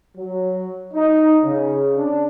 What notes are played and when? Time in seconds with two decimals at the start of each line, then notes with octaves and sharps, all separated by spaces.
0.15 F#3
0.93 D#4
1.43 C#3
1.96 D4